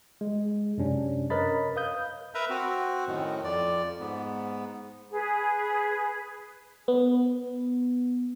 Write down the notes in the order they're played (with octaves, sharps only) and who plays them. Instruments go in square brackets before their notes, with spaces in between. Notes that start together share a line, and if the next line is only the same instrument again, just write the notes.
[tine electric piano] G#3
F#2 C3 C#4 D4
A#4 B4 C#5 D#5 B5 A6
B4 F5 D#6 G6
[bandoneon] A#4 B4 E5 A#5
C4 F#4
F#2 A2 D#3
F2 D5
G#2 B3
[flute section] G#4 B4
[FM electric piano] B3